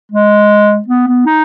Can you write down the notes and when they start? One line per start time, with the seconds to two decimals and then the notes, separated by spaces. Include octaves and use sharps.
0.12 G#3
0.88 B3
1.07 B3
1.26 D#4